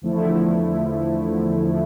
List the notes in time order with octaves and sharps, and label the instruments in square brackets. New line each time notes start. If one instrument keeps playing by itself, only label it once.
[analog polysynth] E2 D3 F3 A3 E4